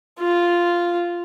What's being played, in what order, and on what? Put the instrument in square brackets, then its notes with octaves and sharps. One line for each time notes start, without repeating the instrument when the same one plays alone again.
[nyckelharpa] F4